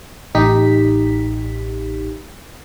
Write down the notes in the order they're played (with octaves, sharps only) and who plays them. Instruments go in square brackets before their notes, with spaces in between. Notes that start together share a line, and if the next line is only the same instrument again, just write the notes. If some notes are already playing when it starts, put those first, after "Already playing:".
[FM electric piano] A1 D#4 G4 B6